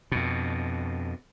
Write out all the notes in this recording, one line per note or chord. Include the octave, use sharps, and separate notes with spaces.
F2 B2